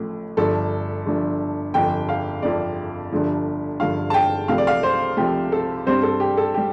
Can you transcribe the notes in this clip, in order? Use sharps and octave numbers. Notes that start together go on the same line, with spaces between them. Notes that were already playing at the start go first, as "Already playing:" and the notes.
Already playing: A1 A2 F3 A3
G1 G2 F3 A4
G1 G2 F3
G1 F2 F3 G5
F5
G1 F2 F3 D5
G1 G2 D3 F3
G1 G2 D3 F3 F5
A5
G5
C2 C3 F3 A3 F5
D5
F5
C5
C2 C3 F3 A3 G4
A4
G2 G3 C4 C5
A4
G4
A4
G3 G4